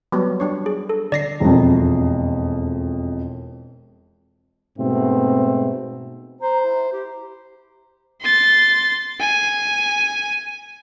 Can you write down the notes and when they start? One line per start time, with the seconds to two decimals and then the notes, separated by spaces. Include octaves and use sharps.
0.12 F#3 G3 B3
0.40 G3 D4 C#5
0.66 G#4
0.89 A4
1.12 D3 D5 A#6 C7
1.40 E1 F2
4.79 G#2 B2 A3 C4
6.41 C5 A#5
6.63 E4
6.93 E4 G4
8.22 C6 A6
9.20 G#5